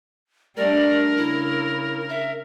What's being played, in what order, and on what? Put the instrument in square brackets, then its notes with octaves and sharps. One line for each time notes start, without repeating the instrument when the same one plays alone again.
[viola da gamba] G3 A3 D4 [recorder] A#4 [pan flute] D5
[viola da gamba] C#3 [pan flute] E4
[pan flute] E5